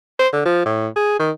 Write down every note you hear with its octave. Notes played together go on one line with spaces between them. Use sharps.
C5
D3
F3
A2
G#4
D#3